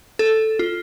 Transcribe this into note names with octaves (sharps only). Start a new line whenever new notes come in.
A4
F4